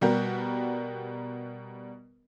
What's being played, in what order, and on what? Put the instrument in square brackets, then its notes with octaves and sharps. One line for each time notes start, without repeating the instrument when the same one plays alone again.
[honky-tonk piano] B2 G3 F#4 G4 A#4